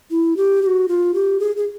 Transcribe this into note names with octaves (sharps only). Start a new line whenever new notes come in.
E4
G4
G4
F#4
F4
G4
G#4
G#4